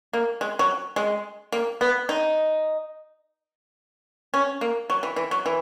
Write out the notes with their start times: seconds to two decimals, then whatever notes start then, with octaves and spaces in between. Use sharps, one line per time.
0.13 A#3
0.41 G#3
0.59 F#3
0.96 G#3
1.52 A#3
1.81 B3
2.09 D#4
4.34 C#4
4.61 A#3
4.90 F#3
5.03 E3
5.16 E3
5.31 F#3
5.46 E3